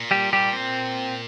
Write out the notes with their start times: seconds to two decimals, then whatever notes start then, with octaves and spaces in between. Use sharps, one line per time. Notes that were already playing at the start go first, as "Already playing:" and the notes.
Already playing: A#2
0.11 G3 G4
0.33 G3 G4
0.53 C4